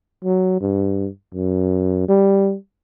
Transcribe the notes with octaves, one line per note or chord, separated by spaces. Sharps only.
F#3
G2
F#2
G3